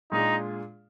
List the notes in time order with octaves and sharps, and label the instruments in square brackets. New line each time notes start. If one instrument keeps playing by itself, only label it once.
[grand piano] A#2 G#3 D4 F4 G#4 [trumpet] D#4